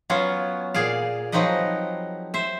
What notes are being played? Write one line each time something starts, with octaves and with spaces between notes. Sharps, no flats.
F#3 B3 C#4 F4 F#4
A#2 G#4 D5 F5
F3 F#3 C4 D#4 B4 D#5
C5 E5